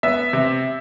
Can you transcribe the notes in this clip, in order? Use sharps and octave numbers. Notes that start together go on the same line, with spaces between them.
B3 E5
C3